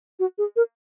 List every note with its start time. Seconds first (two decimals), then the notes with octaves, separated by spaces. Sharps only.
0.19 F#4
0.38 G#4
0.56 A#4